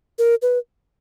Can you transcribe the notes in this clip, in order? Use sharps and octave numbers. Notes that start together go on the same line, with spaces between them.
A#4
B4